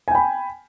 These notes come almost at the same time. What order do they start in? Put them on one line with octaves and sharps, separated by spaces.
G#5 G5 B5